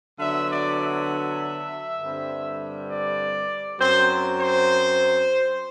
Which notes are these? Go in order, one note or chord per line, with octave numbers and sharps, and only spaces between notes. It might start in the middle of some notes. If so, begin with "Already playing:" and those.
D3 F#3 B3 D4 E5
D5
E5
G2 D3 G3 C4
D5
F#2 F#3 C4 C5
C5